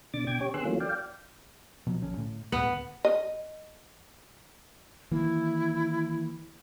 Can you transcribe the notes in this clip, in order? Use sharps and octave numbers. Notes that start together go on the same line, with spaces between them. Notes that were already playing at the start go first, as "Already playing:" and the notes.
B2 D3 D4 D6 A6
B2 G5 D6 G#6
C#4 G4 C#5
D3 B3 G#4 C6 E6 F#6
E3 F#3 A3 A#3 C#4 F4
D5 F5 G5
B2 F3 F#3
A#1 D3 C#4
A2
D2 A2 B3
D#5
D#3 E3 A#3 E4